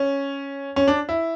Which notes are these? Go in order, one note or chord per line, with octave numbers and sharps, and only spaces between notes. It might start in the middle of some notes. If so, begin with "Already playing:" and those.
Already playing: C#4
C#4
D4
E4